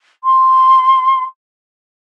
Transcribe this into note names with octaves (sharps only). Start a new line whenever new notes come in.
C6